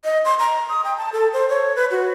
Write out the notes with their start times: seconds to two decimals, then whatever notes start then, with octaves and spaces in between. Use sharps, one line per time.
0.04 D#5
0.25 C6
0.39 A#5
0.69 D#6
0.84 G5
0.97 A5
1.13 A4
1.33 C5
1.49 C#5
1.76 B4
1.91 F#4